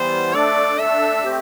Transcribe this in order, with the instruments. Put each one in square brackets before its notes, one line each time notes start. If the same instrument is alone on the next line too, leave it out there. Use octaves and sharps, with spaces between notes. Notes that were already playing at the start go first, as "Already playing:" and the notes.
Already playing: [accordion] E3 G3 B3 [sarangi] C5
[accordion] A3 D4 A4 [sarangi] D5
[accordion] A3 D4 A4 [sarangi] E5
[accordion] A3 C4 G4